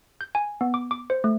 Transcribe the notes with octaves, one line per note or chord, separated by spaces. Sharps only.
G6
G#5
B3
D6
D6
C5
A3